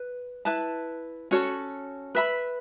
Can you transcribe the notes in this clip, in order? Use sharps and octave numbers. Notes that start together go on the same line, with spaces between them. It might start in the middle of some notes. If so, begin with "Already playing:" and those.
Already playing: B4
E4 B4 A5
C#4 F#4 A4 C#5
B4 E5 B5